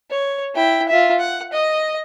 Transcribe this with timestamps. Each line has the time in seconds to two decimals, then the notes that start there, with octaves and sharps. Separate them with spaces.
0.11 C#5
0.55 E4 G5
0.88 F4 E5
1.19 F#5
1.53 D#5